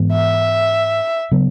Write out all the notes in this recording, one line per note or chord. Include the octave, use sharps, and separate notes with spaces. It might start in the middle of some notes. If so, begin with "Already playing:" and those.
Already playing: G#2 E3 G#3 B3
E5
C#3 F#3 B3